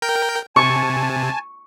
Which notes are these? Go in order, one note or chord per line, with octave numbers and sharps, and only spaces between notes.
A#4 G5 G6
C3 G#5 A5 C#6